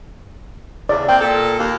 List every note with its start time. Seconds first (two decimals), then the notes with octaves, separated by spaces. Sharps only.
0.89 E2 C#3 D5
1.09 A#3 C4 G5
1.21 A#2 A4
1.59 D#2 A#3